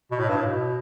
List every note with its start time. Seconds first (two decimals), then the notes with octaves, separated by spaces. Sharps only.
0.11 B2
0.19 A2
0.29 G2
0.37 A2
0.46 B2